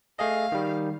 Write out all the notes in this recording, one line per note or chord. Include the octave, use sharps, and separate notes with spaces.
A3 G#4 D#5 F5
D#3 G3